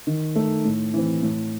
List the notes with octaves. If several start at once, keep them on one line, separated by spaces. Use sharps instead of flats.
D#3
A3 D#4
A2
E3 C4
A2